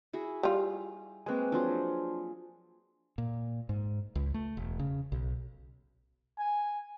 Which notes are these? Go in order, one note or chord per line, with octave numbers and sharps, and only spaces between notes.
E4 F#4 G#4
G3 F4
G#3 A#3 C4 B4 G#5
F3 F#3 D4 G#4 C6
A#2
G#2
C#2
A3
E1
C#3
B1
G#5